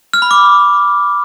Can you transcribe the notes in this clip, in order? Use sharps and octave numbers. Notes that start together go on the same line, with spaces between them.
F6
B5
D6